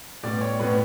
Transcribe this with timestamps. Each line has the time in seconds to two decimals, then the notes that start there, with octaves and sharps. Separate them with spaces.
0.23 A2 G3 B3 D5
0.41 C#5
0.59 A2 G3 B3 B4